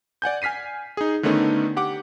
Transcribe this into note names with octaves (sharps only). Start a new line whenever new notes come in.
D5 F#5 G#5 G6
G#5 F6 B6 C7 D#7
D#4 G#4
D3 D#3 A3 B3 C#4 D#4
G4 F#5 D6